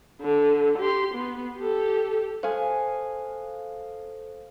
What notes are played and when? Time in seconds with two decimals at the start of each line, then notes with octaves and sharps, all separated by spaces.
0.21 D3
0.79 G4 C6
1.14 B3
1.57 G4 A4
2.43 A4 C5 F5 G#5